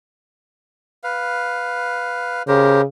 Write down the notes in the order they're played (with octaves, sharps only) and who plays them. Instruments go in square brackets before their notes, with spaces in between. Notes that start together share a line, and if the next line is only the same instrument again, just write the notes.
[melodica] B4 F5
[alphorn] C#3 [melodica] G4 A#4 C5